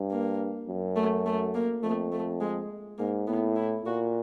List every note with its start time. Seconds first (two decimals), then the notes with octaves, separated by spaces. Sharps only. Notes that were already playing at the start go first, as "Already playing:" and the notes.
Already playing: G2
0.11 A#3
0.68 F#2
0.96 A3
1.26 A3
1.55 A#3
1.83 F2 A3
2.12 A3
2.40 G#3
2.98 G#2 A#3
3.27 A2 B3
3.56 E4
3.85 A#2 F#4